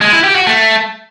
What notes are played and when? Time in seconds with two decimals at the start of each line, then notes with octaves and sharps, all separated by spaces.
0.01 G#3
0.13 E4
0.24 G4
0.35 F#4
0.47 A3